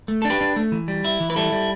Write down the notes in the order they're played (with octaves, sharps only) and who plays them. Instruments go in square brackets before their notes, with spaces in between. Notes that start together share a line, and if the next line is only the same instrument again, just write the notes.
[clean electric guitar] A3
A4
D4
G4 B4
D4
A3
E3
G3
E4
E3
B4
G3 E4 A4
G3